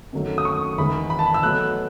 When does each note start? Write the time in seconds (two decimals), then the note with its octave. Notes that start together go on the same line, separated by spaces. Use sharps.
0.13 F#2 D#3 F#3 A3
0.38 D#6
0.45 C#6
0.78 E2 D#3 G#3 B5
1.10 B5
1.19 A5
1.26 B5
1.34 E6
1.42 B2 F#3 A3 F#6